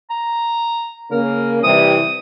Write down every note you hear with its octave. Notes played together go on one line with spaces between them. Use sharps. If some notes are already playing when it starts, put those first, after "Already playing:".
A#5
C#3 A#3 C#4 A#4
C3 E3 G3 D#6